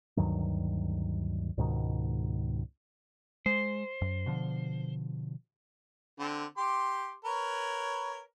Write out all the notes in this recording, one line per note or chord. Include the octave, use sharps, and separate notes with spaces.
D2 G2 D#3 F#3
C#2 G#2 B2 D#3
G#3 C5
F#2
B2 D3 F3
D3 C4
G4 C6 D6
A#4 B4 C#5